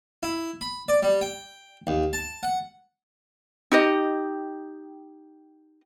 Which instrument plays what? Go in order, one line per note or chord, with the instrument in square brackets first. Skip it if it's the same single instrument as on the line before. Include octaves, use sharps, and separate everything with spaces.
[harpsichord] E4
B5
D5
G3
G5
D#2
A5
F#5
[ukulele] D#4 G4 D#5